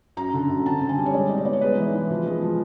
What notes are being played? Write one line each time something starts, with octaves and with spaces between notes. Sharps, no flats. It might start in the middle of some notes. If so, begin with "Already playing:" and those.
F#2 A#5
D3
F#2
C4 A5
D3
G#5
G3
C#5
G#3 D5
D#4
C#5
B3 D5
C#5
G#3 B4
E3
E3
F3
G#3
F3